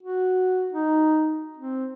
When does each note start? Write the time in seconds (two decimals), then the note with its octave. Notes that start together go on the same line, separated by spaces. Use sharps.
0.03 F#4
0.72 D#4
1.57 C4